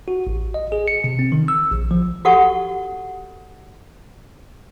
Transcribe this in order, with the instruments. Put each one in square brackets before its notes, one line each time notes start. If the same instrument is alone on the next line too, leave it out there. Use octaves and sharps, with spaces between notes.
[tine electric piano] F#4
A1
D#5
G#4
C#7
C3
C4
D#3
E6
A#1
F3
[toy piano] F#4 G4 A4 F#5 C#6